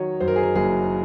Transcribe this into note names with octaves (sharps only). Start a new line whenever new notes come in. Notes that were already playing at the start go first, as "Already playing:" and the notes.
Already playing: D#3 F#3 C#5 D#5
F#2 C5
A#4
G#4
A#4
F#1 G#4